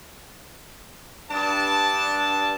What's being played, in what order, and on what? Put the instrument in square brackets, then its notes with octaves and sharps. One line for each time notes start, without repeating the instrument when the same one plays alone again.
[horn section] G2 D4 A5